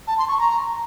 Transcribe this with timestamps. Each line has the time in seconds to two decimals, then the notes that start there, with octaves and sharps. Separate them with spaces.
0.07 A5
0.18 C6
0.28 C#6
0.39 A#5